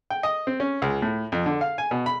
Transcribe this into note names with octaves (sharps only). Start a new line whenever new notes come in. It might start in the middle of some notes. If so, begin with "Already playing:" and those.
G5
D#5
C4
C#4
C#2
A2
F2
D3
F5
G#5
B2
B5